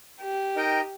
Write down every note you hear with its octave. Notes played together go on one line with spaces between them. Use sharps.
G4
D#4 A#4 D#5 G5